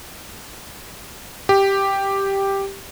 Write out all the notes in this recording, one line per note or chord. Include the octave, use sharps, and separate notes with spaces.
G4